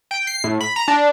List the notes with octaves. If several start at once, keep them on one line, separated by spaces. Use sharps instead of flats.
G5
C7
A2
B5
A#5
D4